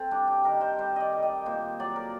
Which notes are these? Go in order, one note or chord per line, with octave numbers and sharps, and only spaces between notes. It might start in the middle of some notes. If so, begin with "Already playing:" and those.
Already playing: C4 A4
G3 D4
G4
D#3 A#4
C5
G3 C5
D5 D#5
D#3
D#5
A#2 C5
F#3 D5
A#4